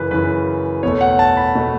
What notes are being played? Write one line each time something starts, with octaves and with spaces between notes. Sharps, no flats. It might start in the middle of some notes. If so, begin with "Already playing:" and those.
Already playing: F#2 C#3 E3 B4
F#2 C#3 E3 B4
E2 B2 A3 C#5
F#5
A5
B5
B2 A3